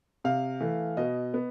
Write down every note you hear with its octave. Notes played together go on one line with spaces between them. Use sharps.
C3 F5
E3 A3
B2 D#5
B3